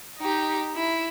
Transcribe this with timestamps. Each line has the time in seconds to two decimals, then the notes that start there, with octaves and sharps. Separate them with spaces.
0.18 D#4 G4
0.76 E4